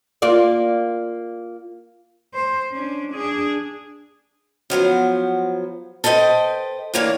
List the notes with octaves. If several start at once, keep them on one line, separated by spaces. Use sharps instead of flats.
A#3 F4 D5
C5
C#4 D4
D4 G#4
F3 F#3 B3 C5
A4 B4 C5 D#5 G5
A2 E3 A#3 D4 C#5